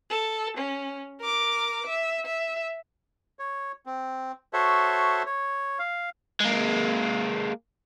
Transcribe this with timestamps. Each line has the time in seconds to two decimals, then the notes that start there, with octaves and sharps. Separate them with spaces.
0.10 A4
0.58 C#4
1.20 A#4 D6
1.86 E5
2.26 E5
3.39 C#5
3.86 C4
4.53 F#4 A4 C5 C#5 E5
5.26 C#5
5.79 F5
6.41 G#3 A#3